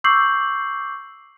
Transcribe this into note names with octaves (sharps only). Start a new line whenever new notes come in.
C#6 D6 E6 G6 C7 F#7